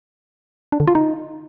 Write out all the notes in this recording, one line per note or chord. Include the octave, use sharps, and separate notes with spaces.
D4
D3
F4
D#4